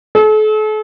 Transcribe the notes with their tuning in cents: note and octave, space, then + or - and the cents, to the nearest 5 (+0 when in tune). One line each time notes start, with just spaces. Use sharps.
A4 -40